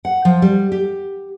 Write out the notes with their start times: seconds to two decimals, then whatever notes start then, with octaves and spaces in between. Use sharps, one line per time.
0.05 F#5
0.25 F3
0.42 G3
0.72 G4